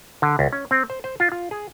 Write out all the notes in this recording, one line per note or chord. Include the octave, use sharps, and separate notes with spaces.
D3
C#2
C#4
C4
C5
C5
F4
F4
G#4